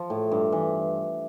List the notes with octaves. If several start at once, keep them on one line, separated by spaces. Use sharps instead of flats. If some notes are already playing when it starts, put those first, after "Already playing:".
Already playing: F3
A2
G2
E3